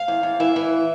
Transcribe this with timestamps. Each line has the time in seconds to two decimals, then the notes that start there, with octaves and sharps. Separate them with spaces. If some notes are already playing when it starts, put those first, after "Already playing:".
Already playing: F5
0.08 E2
0.23 E2
0.40 E3 E5
0.56 E3